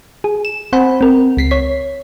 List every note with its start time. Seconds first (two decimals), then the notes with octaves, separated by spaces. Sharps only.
0.24 G#4
0.45 E7
0.73 C4 C5 F#5 G#5 B5
1.01 C4 A#4
1.37 C#2 B6 C7
1.51 C#5 B6